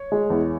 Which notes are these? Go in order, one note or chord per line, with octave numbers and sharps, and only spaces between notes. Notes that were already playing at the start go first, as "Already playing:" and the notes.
Already playing: C#5
G#3
E2